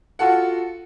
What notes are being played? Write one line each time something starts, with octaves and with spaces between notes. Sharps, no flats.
F4 F#4 A4 F#5